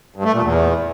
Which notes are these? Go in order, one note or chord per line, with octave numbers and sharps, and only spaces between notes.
G2
A3
A#2
E2